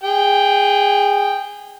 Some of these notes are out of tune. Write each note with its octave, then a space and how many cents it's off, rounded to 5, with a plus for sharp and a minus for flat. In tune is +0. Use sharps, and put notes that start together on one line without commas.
G#4 -20 G5 +0